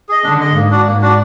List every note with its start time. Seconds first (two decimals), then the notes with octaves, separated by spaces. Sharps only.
0.09 G#4 D#5
0.24 D3 D4
0.40 G#4 D#5
0.55 G#2 A#3
0.70 D4 F#4 D5
0.87 G#2 A#3
1.01 D4 F#4 D5